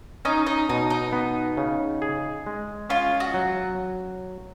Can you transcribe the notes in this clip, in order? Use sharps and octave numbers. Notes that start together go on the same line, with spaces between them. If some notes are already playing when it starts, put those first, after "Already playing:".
C#4 D#4
D#4
B2 D#4
D#4
B3
C#3
G#4
G#3
C#4 F4
F#4
F#3